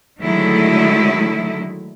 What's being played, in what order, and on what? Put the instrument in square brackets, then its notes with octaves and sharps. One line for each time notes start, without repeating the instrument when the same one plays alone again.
[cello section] D3 D#3 F#3 G#3 A3 E4